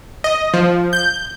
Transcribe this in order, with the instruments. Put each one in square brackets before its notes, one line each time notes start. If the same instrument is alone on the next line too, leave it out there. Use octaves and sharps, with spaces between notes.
[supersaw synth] D#5
F3
G6